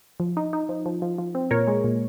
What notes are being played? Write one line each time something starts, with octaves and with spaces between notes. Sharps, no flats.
F3
D#4
D#4
F3
F3
F3
F3
C4
A#2 A#4 C#5
G#3
A#2